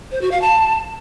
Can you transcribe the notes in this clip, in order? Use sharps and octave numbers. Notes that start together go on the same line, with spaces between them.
C5
F#4
F5
A5